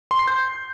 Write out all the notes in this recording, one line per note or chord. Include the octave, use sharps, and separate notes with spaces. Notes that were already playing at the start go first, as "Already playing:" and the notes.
C6
C7
G6